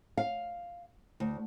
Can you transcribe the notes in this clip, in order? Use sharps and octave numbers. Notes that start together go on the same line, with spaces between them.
F5
D2